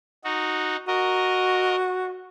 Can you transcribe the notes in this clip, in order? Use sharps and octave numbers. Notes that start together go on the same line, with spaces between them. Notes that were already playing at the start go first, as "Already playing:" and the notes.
D#4 F#4
F#4 A#4 D#5